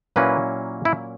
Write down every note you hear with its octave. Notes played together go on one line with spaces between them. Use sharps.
A#2 F#3 A#3 C#4 E4 B4
E4